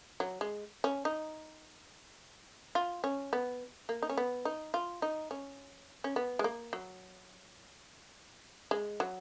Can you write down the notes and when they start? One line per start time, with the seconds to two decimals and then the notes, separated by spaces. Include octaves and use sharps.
0.20 F#3
0.41 G#3
0.84 C#4
1.05 D#4
2.75 F4
3.04 C#4
3.33 B3
3.89 A#3
4.02 D#4
4.10 C#4
4.18 B3
4.45 D#4
4.74 F4
5.02 D#4
5.31 C#4
6.04 C#4
6.16 B3
6.39 G#3
6.44 A#3
6.73 F#3
8.71 G#3
9.00 F#3